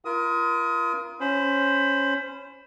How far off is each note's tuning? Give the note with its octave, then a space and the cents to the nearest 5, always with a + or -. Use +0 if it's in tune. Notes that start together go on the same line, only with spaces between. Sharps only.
F4 -30 A#4 +25 D#6 +25
C#4 +0 C5 +0 B5 +20